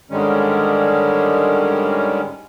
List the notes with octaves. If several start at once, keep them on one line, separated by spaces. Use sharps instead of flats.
G#2 D3 D#3 G3 G#3 C#4